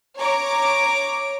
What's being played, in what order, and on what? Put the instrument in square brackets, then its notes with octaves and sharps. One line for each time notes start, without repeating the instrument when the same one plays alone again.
[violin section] C#5 A#5 D6